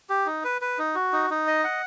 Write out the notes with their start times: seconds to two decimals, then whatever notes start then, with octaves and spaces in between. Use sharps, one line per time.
0.10 G4
0.26 D#4
0.44 B4
0.62 B4
0.79 D#4
0.95 F#4
1.13 D#4
1.30 D#4
1.47 D#5
1.64 F#5